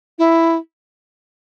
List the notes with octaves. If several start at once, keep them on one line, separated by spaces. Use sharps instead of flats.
E4